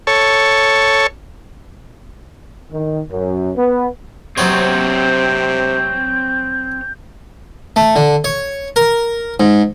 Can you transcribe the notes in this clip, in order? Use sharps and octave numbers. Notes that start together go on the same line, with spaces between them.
A4 C#5
D#3
F#2
B3
C3 F#3 B3 C4 C5 C#5 G6
A3
D3
C#5
A#4
G#2